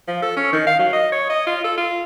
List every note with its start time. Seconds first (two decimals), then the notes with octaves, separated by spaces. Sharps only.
0.08 F3
0.22 A4
0.36 C#4
0.53 D#3
0.67 F5
0.79 F#3
0.93 D#5
1.12 C#5
1.29 D#5
1.46 F4
1.64 A4
1.78 F4